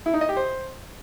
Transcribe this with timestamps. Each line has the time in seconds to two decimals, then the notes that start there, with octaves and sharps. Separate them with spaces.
0.06 E4
0.13 D#4
0.21 D#5
0.29 G4
0.37 C5